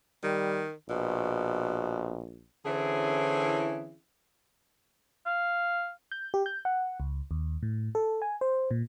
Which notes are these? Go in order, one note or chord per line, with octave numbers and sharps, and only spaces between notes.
D#3 G3
A#1 B2
D3 E3 C4 C#4 E4 G#4
F5
G6
G4
G6
F#5
C#2
D#2
A2
A4
G#5
C5
A#2